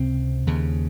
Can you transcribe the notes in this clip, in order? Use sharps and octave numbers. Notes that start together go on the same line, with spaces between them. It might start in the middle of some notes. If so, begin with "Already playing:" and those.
Already playing: C#2 C3 C4
D#2 C#3